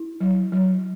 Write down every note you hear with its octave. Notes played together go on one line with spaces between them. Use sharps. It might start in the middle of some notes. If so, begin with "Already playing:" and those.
Already playing: E4
F#3
F#3